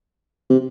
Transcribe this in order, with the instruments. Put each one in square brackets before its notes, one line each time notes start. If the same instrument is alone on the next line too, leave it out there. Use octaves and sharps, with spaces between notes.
[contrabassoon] C3